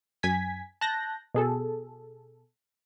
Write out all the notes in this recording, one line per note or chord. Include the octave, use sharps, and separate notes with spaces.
F#2 G#5 G#6 B6
A5 F#6 G6 A#6
B2 G#4 A4